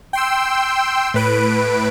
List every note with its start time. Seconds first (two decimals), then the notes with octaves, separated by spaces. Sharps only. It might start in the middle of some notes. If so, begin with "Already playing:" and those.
0.13 G5 C6 E6
1.14 A2 B4 D7